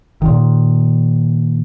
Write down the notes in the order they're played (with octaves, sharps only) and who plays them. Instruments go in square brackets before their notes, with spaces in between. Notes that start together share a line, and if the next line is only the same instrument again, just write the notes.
[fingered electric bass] A#2 D#3